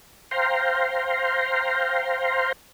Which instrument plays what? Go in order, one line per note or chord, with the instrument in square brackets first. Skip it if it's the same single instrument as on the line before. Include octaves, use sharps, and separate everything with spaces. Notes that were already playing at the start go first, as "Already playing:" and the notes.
[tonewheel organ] C5 F5 G5 A#5 C6